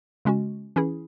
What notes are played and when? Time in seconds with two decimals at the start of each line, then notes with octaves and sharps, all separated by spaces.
0.25 C#3 G#3 C#4 F#4
0.76 E3 C#4 E4 G#4